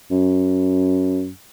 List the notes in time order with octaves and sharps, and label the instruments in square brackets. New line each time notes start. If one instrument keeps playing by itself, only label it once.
[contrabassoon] F#2